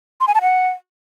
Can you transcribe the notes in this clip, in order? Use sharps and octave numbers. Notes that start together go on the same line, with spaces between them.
C6
G#5
A5
F#5